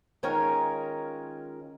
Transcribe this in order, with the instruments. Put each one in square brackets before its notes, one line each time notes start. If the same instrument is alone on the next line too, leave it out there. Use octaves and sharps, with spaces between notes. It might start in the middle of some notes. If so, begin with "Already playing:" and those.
[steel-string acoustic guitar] D#3 G#3 C#4 F4 A#4 C#5